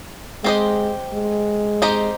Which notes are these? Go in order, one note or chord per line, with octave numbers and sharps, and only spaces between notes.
G#3 C4 G4 C5 D#5
G#3
C4 D#4 G4 C5 D#5